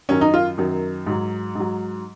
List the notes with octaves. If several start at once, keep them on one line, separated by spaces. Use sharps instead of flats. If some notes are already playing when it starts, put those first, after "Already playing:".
F#2 D#3 F#3 C#4
D#4
F4
F#2 D#3 F#3
G#2 F#3
G#2 F#3